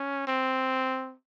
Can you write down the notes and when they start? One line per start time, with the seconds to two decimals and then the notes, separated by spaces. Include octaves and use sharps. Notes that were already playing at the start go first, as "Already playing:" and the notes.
Already playing: C#4
0.27 C4